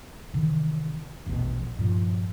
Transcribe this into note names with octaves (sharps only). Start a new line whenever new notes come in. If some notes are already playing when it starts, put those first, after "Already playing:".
C3 D#3 E3
F1 A#1 E2 B2
G2 A#2 F3